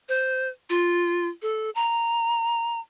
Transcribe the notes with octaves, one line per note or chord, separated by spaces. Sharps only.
C5
F4
A4
A#5